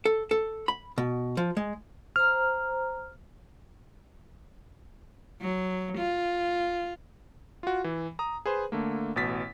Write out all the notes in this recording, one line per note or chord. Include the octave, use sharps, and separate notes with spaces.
A4
A4
B5
B2
F3
G#3
C5 A#5 F6
F#3
F4
F4 F#4
E3
A#5 D#6
G#4 B4 C5
D3 A3 A#3
A1 B2 A6 B6